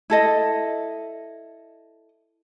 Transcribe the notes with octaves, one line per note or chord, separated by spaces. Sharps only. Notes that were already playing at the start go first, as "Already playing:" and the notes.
E4 A4 D#5